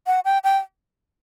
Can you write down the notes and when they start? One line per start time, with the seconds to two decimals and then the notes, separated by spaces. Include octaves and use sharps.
0.07 F#5
0.25 G5
0.44 G5